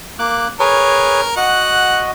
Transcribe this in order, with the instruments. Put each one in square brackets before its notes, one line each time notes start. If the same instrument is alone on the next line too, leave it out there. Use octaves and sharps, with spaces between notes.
[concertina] A#3 D6 F#6
[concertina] G#4 B4 C#5 [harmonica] A#4
[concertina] F#4 D#5 [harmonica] F#5